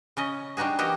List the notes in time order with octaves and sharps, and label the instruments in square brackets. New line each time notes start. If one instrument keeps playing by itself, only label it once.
[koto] C#3 C#4 D#5
G3 D4 D#4 F#4 G#4
E3 A#3 F#4 G4 D#5